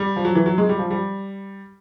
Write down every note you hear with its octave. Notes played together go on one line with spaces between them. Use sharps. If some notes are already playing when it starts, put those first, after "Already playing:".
Already playing: G3
F3
F#3
E3
F#3
G#3
G3
F3
G3